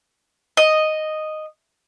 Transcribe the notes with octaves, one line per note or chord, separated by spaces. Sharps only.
D#5